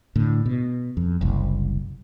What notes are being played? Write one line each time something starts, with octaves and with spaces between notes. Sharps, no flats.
A2 D3
B2
F2
F#1 C2